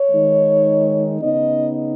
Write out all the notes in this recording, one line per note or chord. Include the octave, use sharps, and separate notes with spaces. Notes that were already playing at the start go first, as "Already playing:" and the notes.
Already playing: C#5
D#3 G#3 D#4
C#3 B3 D#4 D#5